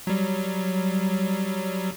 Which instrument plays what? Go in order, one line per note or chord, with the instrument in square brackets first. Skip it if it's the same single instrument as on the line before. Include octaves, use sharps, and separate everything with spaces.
[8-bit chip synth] F#3 G3